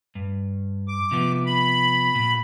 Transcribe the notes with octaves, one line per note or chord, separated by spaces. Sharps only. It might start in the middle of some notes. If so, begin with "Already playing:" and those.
G2
D6
C3 F3 B3
B5
A#2